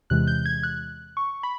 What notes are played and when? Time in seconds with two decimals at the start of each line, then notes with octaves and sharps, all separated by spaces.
0.10 E2 C3 E3 G#3 F#6
0.27 G6
0.46 G#6
0.63 F#6
1.17 C#6
1.43 B5